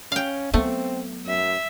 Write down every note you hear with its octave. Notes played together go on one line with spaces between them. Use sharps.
C#4 F5 G5
F#3 A3 B3 C4
F#2 E5